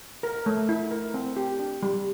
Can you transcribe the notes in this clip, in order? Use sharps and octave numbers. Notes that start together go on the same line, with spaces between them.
A#4
A3
E4
A#4
C4
G4
D4
G3